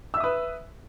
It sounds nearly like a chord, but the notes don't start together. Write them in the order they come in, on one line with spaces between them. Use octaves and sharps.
E6 E5 D#6 B4